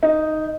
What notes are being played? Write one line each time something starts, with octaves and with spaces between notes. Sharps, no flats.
D#4